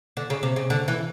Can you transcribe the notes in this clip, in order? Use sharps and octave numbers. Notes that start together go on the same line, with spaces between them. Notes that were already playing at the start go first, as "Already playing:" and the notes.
D3
C#3
C3
C#3
D3
E3